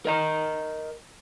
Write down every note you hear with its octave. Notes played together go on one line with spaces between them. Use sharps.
A#4 D#5 A#5